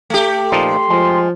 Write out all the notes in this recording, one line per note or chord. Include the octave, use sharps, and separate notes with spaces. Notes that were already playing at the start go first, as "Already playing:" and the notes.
A3 G4
A#2 F3 D#4 C6
F3 G#3